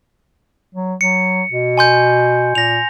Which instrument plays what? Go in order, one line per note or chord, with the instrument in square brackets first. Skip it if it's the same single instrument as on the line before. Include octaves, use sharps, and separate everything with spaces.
[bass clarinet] F#3
[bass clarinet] F#3 [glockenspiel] C#7
[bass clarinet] B2
[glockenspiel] G#5 C6 G6
[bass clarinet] A#2 [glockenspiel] A#6 F7